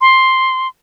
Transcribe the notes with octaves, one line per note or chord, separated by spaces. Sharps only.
C6